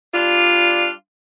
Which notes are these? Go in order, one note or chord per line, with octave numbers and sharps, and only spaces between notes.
G3 D4 F4